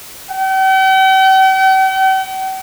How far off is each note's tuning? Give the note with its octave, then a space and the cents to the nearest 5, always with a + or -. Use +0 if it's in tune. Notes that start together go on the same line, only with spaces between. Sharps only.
G5 -45